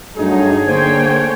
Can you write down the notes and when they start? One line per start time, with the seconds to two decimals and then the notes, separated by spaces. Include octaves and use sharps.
0.17 G2 F#3 A3 D#4 G#4
0.66 D3 A#3 C5 C#5 G5 G#6